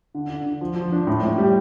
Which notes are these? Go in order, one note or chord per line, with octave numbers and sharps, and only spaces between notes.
D3
D3
D3
F3
F3
D4
A2
A2
G3